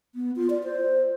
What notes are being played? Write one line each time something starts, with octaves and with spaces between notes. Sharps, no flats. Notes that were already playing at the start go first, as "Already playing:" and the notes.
B3
F4
D5
C5